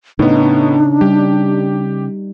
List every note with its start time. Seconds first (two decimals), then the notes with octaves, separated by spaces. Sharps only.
0.19 A2 C#3 B3 D4 D#4
1.01 G3 G4